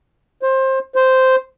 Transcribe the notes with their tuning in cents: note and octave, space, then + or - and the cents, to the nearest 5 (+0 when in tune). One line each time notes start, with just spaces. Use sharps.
C5 +20
C5 -5